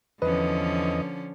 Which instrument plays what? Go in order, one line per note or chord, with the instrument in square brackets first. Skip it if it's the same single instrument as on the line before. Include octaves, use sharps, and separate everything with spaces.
[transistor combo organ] E2 D#5 [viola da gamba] D3 F3 C#4 [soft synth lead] B4